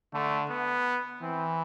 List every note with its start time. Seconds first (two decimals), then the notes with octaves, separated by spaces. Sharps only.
0.14 D3 A3
0.50 B3
1.21 E3 C4